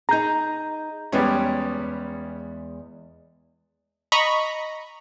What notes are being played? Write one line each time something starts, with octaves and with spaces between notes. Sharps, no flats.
D#4 G#4 A#5 G6
E2 G3 G#3 B3 C#4 G5
D#5 A#5 B5 C#6